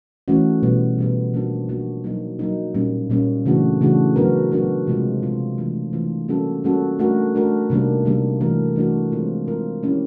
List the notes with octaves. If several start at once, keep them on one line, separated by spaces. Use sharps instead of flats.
E3 A3 C#4 F#4
B2 G3 B3
B2 G3 B3
F3 A#3 D4 F#4
F3 A#3 D4 F#4
F#3 A#3 D#4
F#3 A#3 D#4
A#2 G3 A#3 C#4
A#2 G3 A#3 C#4
C#3 E3 A3 D4 F#4
C#3 E3 A3 D4 F#4
F#3 B3 D4 F#4 A#4
F#3 B3 D4 F#4 A#4
C3 F3 G#3 C4 F4
C3 F3 G#3 C4 F4
E3 A3 D4 F4
E3 A3 D4 F4
G3 A#3 C#4 F#4 A4
G3 A#3 C#4 F#4 A4
A3 D4 F#4 A#4
A3 D4 F#4 A#4
C3 D#3 G3 A#3 D4
C3 D#3 G3 A#3 D4
E3 A3 D4 F#4 A#4
E3 A3 D4 F#4 A#4
D#3 G#3 C4 F4 A#4
D#3 G#3 C4 F4 A#4
F3 A#3 C#4 E4 G4